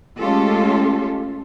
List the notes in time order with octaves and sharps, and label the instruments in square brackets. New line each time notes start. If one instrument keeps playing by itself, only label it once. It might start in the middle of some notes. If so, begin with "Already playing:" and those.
[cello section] G#3 A3 C#4 F4 G4 A4